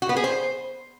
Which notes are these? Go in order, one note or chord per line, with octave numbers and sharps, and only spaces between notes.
F#4
B3
G#4
C5